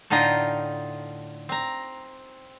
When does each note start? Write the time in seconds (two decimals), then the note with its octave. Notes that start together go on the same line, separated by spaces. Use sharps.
0.10 A2 D3 D#4 F4 G5 A#5
1.49 C4 A#5